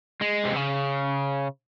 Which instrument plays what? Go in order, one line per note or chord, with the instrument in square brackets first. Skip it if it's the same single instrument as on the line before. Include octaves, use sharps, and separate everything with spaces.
[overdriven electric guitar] G#3
C3
C#3